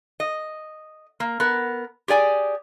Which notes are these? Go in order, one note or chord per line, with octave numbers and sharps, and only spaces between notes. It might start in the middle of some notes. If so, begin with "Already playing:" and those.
D#5
A#3
B3 A#4
G4 G#4 D5 G#5